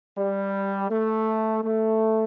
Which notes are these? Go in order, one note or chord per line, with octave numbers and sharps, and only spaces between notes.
G3
A3
A3